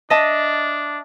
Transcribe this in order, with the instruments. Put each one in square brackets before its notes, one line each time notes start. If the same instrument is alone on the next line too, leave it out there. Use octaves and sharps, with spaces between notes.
[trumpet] D4 [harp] D#5 E5 A5